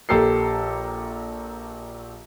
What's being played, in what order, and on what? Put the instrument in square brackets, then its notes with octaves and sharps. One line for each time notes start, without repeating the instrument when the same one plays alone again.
[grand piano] A#1 G4 A4 A#4 C7